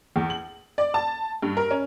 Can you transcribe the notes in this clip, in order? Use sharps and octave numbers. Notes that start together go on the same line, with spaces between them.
E2
F#7
D5
A5
G2
A#4
C#4